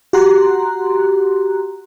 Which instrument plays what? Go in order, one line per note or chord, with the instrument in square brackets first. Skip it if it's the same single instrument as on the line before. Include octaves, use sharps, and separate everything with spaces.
[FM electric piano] F#4 G4 F#5 A#5 C6 F#6